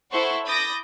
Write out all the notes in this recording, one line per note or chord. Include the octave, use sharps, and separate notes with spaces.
E4 A4 C5 F#5 C#6
B5 D6 D#6 G6 A6 A#6